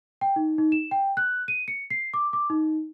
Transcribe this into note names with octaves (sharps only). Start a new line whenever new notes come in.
G5
D#4
D#4
E7
G5
F#6
D#7
C#7
C7
D6
D6
D#4